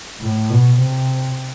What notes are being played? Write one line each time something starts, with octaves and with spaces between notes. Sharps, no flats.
A2
B2
C3